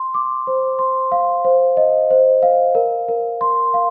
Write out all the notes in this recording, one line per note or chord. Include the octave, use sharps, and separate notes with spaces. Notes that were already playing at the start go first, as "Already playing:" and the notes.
Already playing: C6
D6
C5
C6
F5
C5
D#5
C5
F5
A#4
A#4
C6
F5